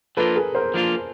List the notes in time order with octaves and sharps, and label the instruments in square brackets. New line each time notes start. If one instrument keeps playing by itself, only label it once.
[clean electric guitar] F3 A#3 D4 F4 [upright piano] A4 B4
[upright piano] G#4 A#4
A#4 C5
[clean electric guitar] F3 A#3 D4 F4